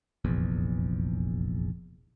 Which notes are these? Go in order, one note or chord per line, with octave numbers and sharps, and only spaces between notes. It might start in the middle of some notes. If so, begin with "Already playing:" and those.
F1 A#1 E2